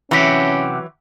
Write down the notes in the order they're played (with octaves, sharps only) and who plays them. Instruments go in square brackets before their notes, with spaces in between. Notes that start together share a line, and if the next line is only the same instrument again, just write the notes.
[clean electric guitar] C3 F#4 G4 [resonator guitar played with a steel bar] E3 F#3 [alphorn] C#4